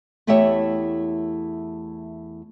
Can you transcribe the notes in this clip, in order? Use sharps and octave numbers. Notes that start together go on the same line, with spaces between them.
E2 A3 E4 G4 C#5 E5